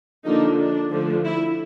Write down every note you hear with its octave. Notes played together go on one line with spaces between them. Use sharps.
D3 F3 A#3 D4 D#4
D4
D3 F3 A3
E4